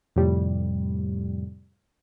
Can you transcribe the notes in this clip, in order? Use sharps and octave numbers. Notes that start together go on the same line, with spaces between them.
F2 A2 C3 G3